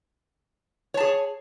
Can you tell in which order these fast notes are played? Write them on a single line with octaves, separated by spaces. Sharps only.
C#5 A5 G#4